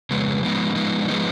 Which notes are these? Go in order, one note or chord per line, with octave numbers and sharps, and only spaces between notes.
F2 C#3 G#3 B3
F3 G#3 B3 D#4
F3 G#3 B3 D#4
F3 G#3 B3 D#4